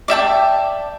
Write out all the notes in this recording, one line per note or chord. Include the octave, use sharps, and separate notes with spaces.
D5 E5 G5 A5